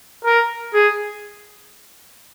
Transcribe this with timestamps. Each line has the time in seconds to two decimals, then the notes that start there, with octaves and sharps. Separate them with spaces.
0.25 A#4
0.74 G#4